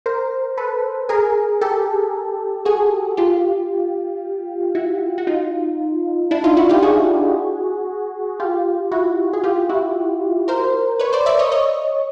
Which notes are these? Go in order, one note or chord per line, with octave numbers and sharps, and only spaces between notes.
A#4 C5
A4 B4
G#4 A#4
G4 A4
F#4 G#4
F4 G4
E4 F#4
F#4
D#4 F4
D4 E4
D#4 F4
E4 F#4
F4 G4
F#4 G#4
F4 G4
E4 F#4
G#4
F4 G4
E4 F#4
A#4 C5
B4 C#5
C5 D5
D5 E5
C#5 D#5
C#5 D#5